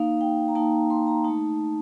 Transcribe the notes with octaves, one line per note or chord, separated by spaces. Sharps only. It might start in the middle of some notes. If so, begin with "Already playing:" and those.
Already playing: A#3 D#4 F5
G5
A#5
A#3 D#4 A5
C6
A#5
A3 D#4 A5